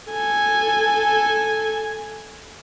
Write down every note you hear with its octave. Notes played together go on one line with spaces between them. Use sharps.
A4 G#5